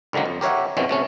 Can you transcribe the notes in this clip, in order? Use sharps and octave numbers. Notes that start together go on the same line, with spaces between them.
C#2 D3 D#3 F#3 A#3
F2
G4 A#4 C#5 E5 F#5
F2 B2 D#3 E3 C4 C#4
C3 A3 C#4